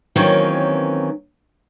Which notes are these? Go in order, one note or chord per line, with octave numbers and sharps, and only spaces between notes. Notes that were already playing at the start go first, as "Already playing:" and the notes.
D#3 E3 F#3 A#3 C4 C#4